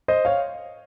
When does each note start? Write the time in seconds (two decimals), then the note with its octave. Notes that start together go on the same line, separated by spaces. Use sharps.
0.08 C5 D#5
0.25 C#5 F5